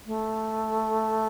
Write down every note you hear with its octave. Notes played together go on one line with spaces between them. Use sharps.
A3